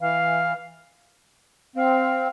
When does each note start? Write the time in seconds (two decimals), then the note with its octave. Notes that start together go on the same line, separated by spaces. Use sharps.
0.01 E3 F5
1.76 C4 F5